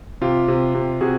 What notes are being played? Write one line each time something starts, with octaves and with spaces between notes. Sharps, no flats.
C3 F4 G4
C3
C3
C3 F#4 G#4